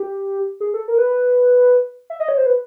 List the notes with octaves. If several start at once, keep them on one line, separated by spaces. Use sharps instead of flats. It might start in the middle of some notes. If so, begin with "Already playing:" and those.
Already playing: G4
G#4
A4
A#4
B4
E5
D#5
C#5
C5
B4